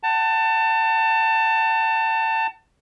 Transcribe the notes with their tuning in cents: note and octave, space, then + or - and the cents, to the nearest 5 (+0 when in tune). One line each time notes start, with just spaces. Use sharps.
F#5 +25 A5 +25